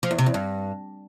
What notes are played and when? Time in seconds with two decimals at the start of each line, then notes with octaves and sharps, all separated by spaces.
0.03 F3
0.11 E2
0.19 C3
0.26 E2
0.34 G2